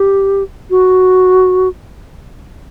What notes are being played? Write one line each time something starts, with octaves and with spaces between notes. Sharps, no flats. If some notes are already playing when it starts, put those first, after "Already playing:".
Already playing: G4
F#4